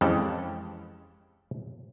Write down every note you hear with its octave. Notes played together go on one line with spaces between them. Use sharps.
F2 E3 G#3 C#4 G4 A4